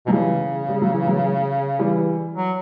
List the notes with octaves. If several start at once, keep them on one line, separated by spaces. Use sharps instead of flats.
B2 F#3
C#3 E3 G3
G3
F#3
E3
F#3
E3 G3
F#3